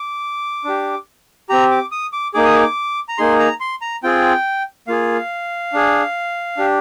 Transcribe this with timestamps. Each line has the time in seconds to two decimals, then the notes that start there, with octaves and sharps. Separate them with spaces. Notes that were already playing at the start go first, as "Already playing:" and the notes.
Already playing: D6
0.65 D4 G4
1.49 C4 G4 A#5
1.71 D6
1.92 D#6
2.13 D6
2.34 A#3 D#4 G#4 D6
2.45 D#6
2.55 D6
3.09 A#5
3.18 A#3 D#4 G#4 C6
3.39 A#5
3.60 C6
3.82 A#5
4.03 C4 F4 G#4 G5
4.87 A#3 F4 G#4 F5
5.73 D4 G#4
6.57 D4 G4